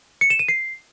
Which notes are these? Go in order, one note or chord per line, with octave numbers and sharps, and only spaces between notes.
C#7
E7
D#7
C7